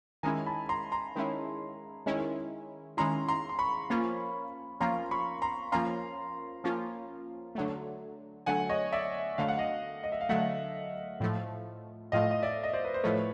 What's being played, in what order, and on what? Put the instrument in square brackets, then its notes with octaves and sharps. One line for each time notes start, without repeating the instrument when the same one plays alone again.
[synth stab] D#3 G#3 C#4 E4 [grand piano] G#5 A#5
[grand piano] A5 B5
A#5 C6
A#5 C6
[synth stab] D#3 G#3 C#4 E4
D#3 G#3 C#4 E4
[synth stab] D#3 G#3 C#4 E4 [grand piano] A#5 C6
[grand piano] A#5 C6
C6
B5 C#6
[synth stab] F3 A#3 C#4 F4
[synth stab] F3 A#3 C#4 F4 [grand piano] A#5 C6
[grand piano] B5 C#6
A#5 C6
[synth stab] F3 A#3 C#4 F4 [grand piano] A#5 C6
[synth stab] F3 A#3 C#4 F4
D3 F#3 A3
[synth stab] D3 F#3 A3 [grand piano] F#5 G#5
[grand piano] C#5 D#5
D5 E5
[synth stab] D3 F#3 A3 [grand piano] F5
[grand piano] F#5
D#5 F5
D#5
E5
F5
[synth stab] D3 F#3 A3 [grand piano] E5 F#5
[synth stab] A2 F3 A3
[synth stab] A2 F3 A3 [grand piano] D#5 F5
[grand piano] D#5
D5 E5
D#5
C5 D5
B4
C5
[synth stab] A2 F3 A3 [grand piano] B4 C#5